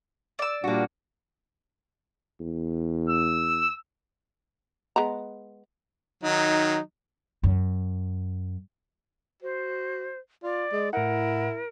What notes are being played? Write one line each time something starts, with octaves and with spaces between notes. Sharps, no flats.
D5 E6
A#2 G3 A#3 D4 F#4
E2
E6
G#3 B3 A#5
D#3 F#3 D#4
F#2
F#4 C5
F4 D5
G#3
A2 E4 A#4 F#5